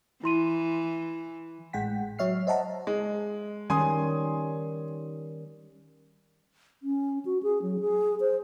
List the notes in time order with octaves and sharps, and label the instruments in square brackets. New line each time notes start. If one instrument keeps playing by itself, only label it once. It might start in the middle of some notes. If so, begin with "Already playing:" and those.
[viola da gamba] E3 [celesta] E4 C6 D#7
[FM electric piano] G#1 A2 G#3 F#5 G5 B6
F#3 C#5 E5 F6 C7
C5 D#5 E5 F#5 A5 A#5
[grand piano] G#3
[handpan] D#3 G3 C#4 [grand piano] G#5 C6 D#6
[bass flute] C#4
F#4
G#4
F#3
G#4
C5